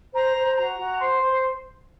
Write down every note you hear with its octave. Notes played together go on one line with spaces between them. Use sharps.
C5 A#5
C5
F#4 A#5
F#4
C5 C6
C5